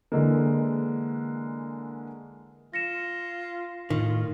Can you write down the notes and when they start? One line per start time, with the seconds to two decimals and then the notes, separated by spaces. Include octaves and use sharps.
0.12 D3 E3 G#3 A#3
2.74 F4 A#6 C#7 E7
3.90 A2 D#3 F4